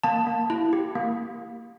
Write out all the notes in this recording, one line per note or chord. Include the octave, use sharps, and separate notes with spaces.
A#3 A5
A#3
E4
G4
A#3